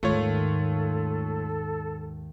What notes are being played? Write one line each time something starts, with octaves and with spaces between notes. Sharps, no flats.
D#2 G#2 A3 F4 A4 C#5